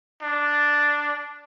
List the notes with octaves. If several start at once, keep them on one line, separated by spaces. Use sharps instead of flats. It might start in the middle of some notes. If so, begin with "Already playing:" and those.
D4